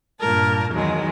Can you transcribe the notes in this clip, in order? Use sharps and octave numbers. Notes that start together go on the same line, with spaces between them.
G2 A#2 A#4 A5
E2 D#3 F#3 G#3